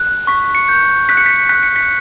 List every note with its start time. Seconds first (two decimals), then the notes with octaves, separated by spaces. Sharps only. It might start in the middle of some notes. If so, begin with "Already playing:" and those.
Already playing: F#6
0.27 C#6 B6
0.55 C#7
0.69 G6
1.09 F#6 B6
1.17 C#7
1.26 B6
1.49 F#6 B6
1.63 C#7
1.76 B6